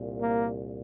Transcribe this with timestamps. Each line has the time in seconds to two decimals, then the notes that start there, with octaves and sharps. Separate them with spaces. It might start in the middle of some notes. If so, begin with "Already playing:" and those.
Already playing: C2 A#2
0.21 A#3